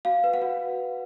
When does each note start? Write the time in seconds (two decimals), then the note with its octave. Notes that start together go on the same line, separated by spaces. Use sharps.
0.05 F#4 F5
0.24 B4
0.34 F#5
0.42 F#4